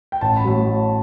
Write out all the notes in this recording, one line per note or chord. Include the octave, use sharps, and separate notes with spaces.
G5
A1 A5
B5
A2 F#3